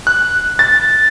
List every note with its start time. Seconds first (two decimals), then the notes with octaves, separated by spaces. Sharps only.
0.07 F#6
0.59 A6